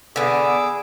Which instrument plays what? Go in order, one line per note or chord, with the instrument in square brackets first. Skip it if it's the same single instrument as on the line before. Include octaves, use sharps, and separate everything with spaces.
[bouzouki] D3 B3 [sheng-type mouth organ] G#4 D6 E6